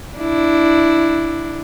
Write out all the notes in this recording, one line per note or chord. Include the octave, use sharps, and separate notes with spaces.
D4 E4